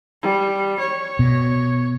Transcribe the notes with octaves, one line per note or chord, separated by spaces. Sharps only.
G3
C#5
B2